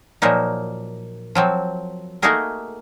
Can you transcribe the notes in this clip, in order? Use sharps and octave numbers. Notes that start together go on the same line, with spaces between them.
A#2 F3 F#3 A#3 D#4
F3 F#3 C4
A3 A#3 D#4 F#4 G#4 A#4